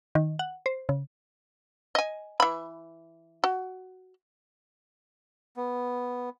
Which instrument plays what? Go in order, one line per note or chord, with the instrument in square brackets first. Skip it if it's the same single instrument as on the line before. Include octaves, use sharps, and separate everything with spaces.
[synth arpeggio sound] D#3
F#5
C5
C#3
[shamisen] D#5 G#5
E3 B5
F#4
[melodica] B3